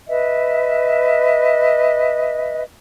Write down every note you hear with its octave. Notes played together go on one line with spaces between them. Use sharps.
B4 D#5 E5